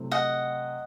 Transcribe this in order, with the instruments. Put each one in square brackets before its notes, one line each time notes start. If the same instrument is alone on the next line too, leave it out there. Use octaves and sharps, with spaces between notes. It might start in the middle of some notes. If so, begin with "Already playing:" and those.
Already playing: [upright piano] C3 F#3 A3 C4 E4
[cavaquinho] D#5 F#5